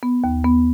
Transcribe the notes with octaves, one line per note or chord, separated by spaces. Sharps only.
B3
D#2
B3